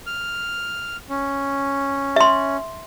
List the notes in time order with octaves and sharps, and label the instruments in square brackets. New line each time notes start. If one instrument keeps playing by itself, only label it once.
[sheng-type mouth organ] F6
C#4
[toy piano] E5 C6